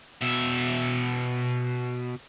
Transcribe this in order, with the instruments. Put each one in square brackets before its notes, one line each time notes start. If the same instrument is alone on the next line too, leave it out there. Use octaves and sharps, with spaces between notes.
[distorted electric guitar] B2 E5